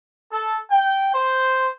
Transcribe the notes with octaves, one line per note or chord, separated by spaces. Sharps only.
A4
G5
C5